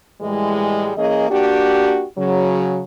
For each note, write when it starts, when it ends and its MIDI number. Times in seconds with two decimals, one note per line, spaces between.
0.22 0.93 45
0.22 0.93 52
0.22 0.93 55
0.22 0.93 56
0.97 1.29 52
0.97 1.29 58
0.97 1.29 61
0.97 1.29 68
0.97 1.29 75
1.30 2.05 58
1.30 2.05 62
1.30 2.05 66
1.30 2.05 67
2.18 2.83 49
2.18 2.83 54